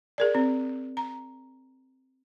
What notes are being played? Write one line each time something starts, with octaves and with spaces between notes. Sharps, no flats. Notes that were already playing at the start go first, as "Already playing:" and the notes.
G#4 A#4 D5
C4
A#5